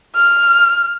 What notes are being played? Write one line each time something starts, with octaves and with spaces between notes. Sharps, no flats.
F6